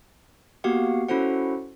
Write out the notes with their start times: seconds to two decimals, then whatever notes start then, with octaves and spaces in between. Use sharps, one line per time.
0.64 A#3 B3 F#4 G4 F5 F#5
1.08 C#4 E4 F#4 A4 C5 F#5